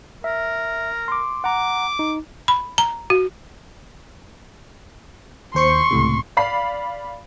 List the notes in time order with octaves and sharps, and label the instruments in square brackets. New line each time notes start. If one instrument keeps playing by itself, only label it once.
[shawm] A#4 [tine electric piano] E5
[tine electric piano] C6 D6
[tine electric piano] F#5 A#5 [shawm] D6
[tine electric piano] D#4
[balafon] B5
A#5
F#4
[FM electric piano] D#2 C5 C#7 [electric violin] C6 C#6
[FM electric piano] C#2 A2 C3
[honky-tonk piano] D5 F5 B5 C7